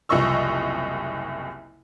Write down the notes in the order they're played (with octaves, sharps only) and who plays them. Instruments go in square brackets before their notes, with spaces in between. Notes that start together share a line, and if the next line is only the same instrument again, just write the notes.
[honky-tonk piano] F#1 C2 F3 D#5 C#6 E6